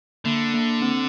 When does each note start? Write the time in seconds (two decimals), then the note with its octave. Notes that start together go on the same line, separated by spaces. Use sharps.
0.25 D3 A#3
0.54 A#3
0.82 C4